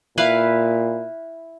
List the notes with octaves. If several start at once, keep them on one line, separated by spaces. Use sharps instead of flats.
A#2 E4 B4 F5